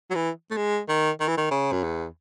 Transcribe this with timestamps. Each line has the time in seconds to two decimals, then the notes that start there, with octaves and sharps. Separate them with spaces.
0.11 F#3
0.15 E3
0.51 A3
0.57 G#3
0.89 D#3
1.20 D#3
1.28 E3
1.37 D#3
1.51 C#3
1.72 F#2
1.84 E2